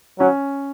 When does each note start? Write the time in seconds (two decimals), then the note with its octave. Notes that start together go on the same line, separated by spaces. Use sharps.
0.19 F#3 C#4